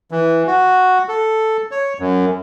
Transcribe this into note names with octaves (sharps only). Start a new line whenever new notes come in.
E3
F#4
A4
C#5
F#2